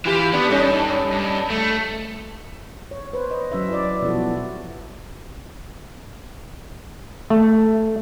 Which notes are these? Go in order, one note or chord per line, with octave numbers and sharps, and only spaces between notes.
E3 F4 G4
B3 D4
G2 C#4 D#4 A4
G2
A3
C#5
B4 C5
D#5
F#3 C#4 B4 E5
E4 D5
B2 F3 G3 E4 F#4 A4
A3